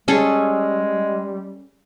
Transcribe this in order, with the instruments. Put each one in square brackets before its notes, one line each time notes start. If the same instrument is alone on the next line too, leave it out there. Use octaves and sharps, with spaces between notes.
[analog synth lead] G3 [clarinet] G#3 [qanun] C#4 G#4 A4